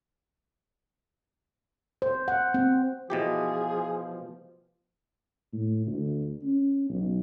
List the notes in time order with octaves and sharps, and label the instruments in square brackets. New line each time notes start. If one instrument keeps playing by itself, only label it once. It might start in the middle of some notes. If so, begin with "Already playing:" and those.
[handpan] C5
F#5
C4
[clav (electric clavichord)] B2 E3 G4 [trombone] F3 [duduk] G#4
[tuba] A2
D2
C#4
B1